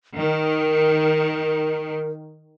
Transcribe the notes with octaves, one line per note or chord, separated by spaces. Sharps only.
D#3 A#4